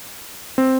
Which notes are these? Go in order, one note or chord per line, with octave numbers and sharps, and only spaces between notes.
C4